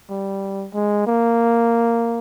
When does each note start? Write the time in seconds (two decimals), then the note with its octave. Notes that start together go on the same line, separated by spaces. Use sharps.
0.10 G3
0.74 G#3
1.07 A#3